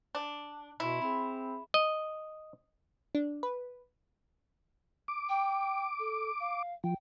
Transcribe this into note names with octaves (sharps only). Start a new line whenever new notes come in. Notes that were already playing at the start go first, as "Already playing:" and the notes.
D4
B2 E4 C6 B6
C4 G#4 B5
D#5
D4
B4
D6
G5
A4
F5
F3 G5